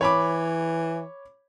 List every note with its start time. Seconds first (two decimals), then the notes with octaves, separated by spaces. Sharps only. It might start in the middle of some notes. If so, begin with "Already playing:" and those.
0.01 E3 C#5 B5 D6